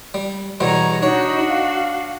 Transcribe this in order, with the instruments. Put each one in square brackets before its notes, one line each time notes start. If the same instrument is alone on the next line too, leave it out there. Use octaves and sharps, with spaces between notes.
[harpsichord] G3
[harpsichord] E2 B2 G3 [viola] C#5 A#5
[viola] D4 F#4 [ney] D#4 [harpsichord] C#5
[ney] F5